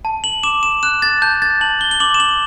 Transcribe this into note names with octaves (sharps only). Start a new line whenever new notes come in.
A5
F#7
D6 E7
E7
F#6 E7
A6
A5 G6
A6
A5 F#7
G7
G7
D6 F#7
E7
F#7